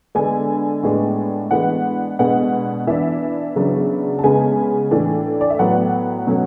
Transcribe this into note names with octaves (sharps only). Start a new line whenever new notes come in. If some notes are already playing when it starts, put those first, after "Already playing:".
D3 G#3 B3 D4 G#5
A2 G#3 B3 D4
E3 G#3 B3 D4 F#5
B2 G#3 B3 D4 F#5
E3 B3 D4 E5
C#3 F#3 B3 D4
A5
C#3 G#3 B3 G#5
A2 E3 A3 D4
D5
E5
A2 F#3 B3 F#5
B2 F#3 A3 C#4